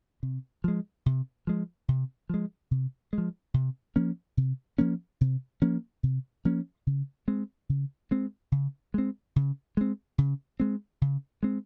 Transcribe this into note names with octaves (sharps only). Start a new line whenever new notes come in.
C3
F3 G#3
C3
F3 G#3
C3
F3 G#3
C3
G#3
F3
C3
F3 A#3 C#4
C3
F3 A#3 C#4
C3
F3 A#3 C#4
C3
F3 A#3 C#4
C#3
G#3 C4
C#3
G#3 C4
C#3
G#3 C4
C#3
G#3 C4
C#3
G#3 C4
C#3
G#3 C4